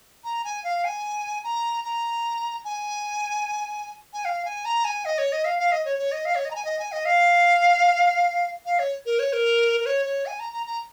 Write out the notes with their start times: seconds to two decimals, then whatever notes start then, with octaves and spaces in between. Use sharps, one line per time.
0.24 A#5
0.44 G#5
0.64 F5
0.84 G#5
1.43 A#5
1.84 A#5
2.64 G#5
4.13 G#5
4.24 F5
4.44 G#5
4.64 A#5
4.84 G#5
5.05 D#5
5.18 C#5
5.32 D#5
5.44 F5
5.58 F5
5.71 D#5
5.85 C#5
5.98 C#5
6.11 D#5
6.25 F5
6.35 C#5
6.44 D#5
6.50 A#5
6.55 G#5
6.64 D#5
6.78 G#5
6.91 D#5
7.05 F5
8.65 F5
8.79 C#5
9.05 A#4
9.19 C#5
9.32 A#4
9.80 A#4
9.85 C#5
10.05 C#5
10.26 G#5
10.39 A#5
10.52 A#5
10.66 A#5